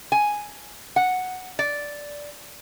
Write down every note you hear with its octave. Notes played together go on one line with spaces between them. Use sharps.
G#5
F#5
D5